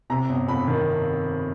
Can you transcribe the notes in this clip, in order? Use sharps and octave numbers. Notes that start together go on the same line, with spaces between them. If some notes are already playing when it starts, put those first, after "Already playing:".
C3 A#5
G1
F2 B5
D#3